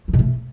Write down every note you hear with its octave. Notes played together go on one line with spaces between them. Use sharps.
E3
B2
A3